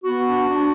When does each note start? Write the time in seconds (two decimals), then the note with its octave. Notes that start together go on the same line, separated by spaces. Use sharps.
0.04 B3 F#4
0.26 D4
0.47 D4